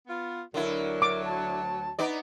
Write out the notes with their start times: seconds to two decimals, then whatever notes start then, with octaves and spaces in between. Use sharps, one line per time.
0.07 B3 F4
0.54 D2 D3 F#3 E4 A#4
1.02 D6
1.25 A5
1.99 B3 D#4 D5